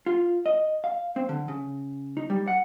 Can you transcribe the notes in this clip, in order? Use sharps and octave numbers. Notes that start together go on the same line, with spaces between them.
F4
D#5
F5
C4
D3
C#3
D#4
G3
F#5